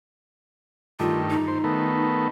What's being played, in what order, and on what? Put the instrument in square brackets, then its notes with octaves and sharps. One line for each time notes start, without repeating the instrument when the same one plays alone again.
[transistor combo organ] G2 D#3 A3 [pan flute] F4
[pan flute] D#4
[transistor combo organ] C5
D#3 A3 B3